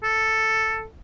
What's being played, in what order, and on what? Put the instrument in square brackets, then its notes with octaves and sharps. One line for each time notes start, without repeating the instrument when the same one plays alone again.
[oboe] A4